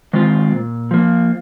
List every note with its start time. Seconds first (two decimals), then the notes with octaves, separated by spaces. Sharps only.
0.13 D#3 G#3 C4 F4
0.52 A#2
0.91 F3 A#3